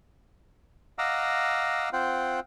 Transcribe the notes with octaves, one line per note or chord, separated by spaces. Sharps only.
D#5 F5 F#5 A#5 D6 E6
C4 F4 C5 F#5 G5